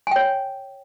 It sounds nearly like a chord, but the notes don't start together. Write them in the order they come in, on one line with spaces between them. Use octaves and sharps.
G#5 G5 C#5